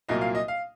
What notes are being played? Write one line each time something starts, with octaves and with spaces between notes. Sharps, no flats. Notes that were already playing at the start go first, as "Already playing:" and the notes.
C2 A#2 F#3 A#3 D#5
F5
D#5
F5